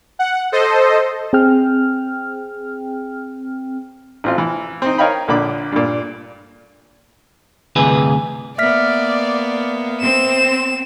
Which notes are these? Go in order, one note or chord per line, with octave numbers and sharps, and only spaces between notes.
F#5
A4 C5 D#5
C4 G#4 G5 F6
A1 C4 F4
E3
C4 D#4
A#4 C#5 D#5 F5 G5 B5
A#1 A#2 D3 B5 D6
G2 A#2
D2 G2 C3 E3 G#4 B4
A#3 B3 D5 E5 F6 B6
C4 E7